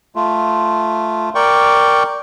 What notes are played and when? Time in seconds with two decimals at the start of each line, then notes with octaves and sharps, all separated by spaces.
0.16 A3 F4
1.35 A#4 D5 G5 C#6